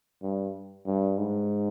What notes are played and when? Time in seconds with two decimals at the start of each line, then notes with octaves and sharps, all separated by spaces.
0.23 G2
0.86 G2
1.18 G#2